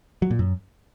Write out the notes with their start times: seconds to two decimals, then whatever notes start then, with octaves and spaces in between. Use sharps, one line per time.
0.22 F#3
0.31 A#2
0.39 F#2